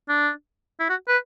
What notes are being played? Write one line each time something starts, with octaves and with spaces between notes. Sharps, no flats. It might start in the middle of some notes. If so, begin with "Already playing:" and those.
D4
E4
F#4
B4